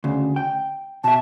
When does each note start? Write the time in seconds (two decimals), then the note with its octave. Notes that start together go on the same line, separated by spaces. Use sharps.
0.04 D2 C#3
0.36 G5
1.04 B2 E5 A5